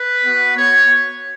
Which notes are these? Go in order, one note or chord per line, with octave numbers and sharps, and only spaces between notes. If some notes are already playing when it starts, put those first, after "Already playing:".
Already playing: B4
B3 F#4
B3 F#4 C#5